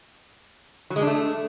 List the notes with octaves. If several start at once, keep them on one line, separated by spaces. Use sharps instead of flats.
F#3
G#3
D4
A3